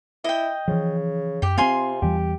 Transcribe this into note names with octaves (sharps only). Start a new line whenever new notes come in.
E4 D#5 G5
C#3 E3 F3
F#2 G4 G5
C3 B3 C4 F4 G#5 C6
E2 E3 G3 G4